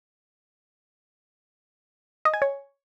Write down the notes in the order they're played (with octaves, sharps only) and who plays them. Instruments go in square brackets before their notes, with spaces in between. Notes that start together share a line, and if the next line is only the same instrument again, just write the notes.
[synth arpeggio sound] D#5
G#5
C#5